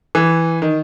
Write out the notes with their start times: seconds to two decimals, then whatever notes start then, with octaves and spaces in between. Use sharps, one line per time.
0.15 E3
0.62 D#3